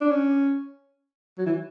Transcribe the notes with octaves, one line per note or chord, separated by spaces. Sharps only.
D4
C#4
F#3
E3